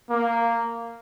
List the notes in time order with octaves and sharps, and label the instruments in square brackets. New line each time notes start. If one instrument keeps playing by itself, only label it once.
[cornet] A#3